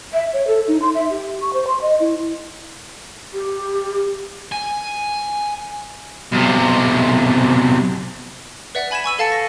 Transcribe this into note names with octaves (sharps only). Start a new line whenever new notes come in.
E5
C#5
A4
D#4
C6
E5
G4
C#6
C5
C6
D#5
E4
G4
G#5
B1 C3
B4 D5 E5 F#5
G#5 B5 G#6 B6 E7
G#5 C#6 E6 D#7
A4 F5 A5 A6 C#7
A#6